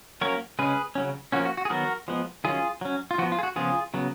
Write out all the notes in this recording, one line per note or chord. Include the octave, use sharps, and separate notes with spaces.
F#3 A#3 C#4 A#4 C#5
C#3 G#3 C#4 G#4 B4
C#3 F#3 C#4
F3 A#3 C#4 F#4
F#4
F#4
G#4
D#3 F#3 B3 F#4 A#4
F3 G#3 B3
D#3 F#3 C#4 F4 G#4
F#3 C#4
F4
F3 B3 F#4
F4
G#4
F#4
C#3 F3 B3 F4 G#4
C#3 F#3 B3